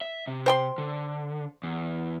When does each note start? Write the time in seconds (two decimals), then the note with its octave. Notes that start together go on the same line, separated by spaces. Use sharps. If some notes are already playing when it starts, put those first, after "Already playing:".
0.01 E5
0.27 C3
0.46 C5 G5 C6
0.78 D3
1.63 E2